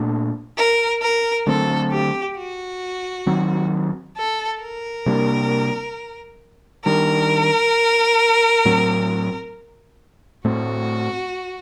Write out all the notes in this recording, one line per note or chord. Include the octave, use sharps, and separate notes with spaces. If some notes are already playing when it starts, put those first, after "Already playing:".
Already playing: A#2 A3 D4
A#4
A#4
D3 F#3 A3 C4 A4
G4
F#4
D#3 F#3 C4
A4
A#4
C3 G3 A#3 D4
D#3 G3 D4 A#4
A2 F#3 C4
A2 A3 C4 F#4